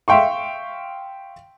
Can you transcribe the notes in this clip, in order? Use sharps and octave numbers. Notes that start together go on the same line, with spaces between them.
E5 F5 G5 C6 C#6